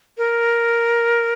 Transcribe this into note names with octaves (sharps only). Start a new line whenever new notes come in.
A#4